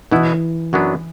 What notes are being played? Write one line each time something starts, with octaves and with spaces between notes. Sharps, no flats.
B2 E3 B3 E4
F#2 F#3 B3 D4